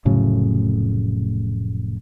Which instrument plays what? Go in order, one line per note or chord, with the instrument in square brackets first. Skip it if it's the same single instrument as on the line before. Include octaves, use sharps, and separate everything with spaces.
[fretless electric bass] F1 A2 C#3 F#3